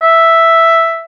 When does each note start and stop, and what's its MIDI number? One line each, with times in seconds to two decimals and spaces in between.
0.03 1.03 76